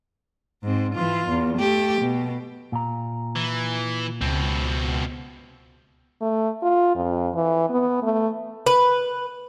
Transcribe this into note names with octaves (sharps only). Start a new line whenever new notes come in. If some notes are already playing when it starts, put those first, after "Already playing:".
G#2 C4
E3 F4
E2
A3 G4
B2
A#2 A#5
E3
C#2 B2 C4
A3
F4
F2
E3
B3
A3
B4